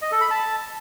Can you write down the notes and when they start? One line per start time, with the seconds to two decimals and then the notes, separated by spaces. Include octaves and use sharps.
0.02 D#5
0.11 A4
0.21 B5
0.31 A5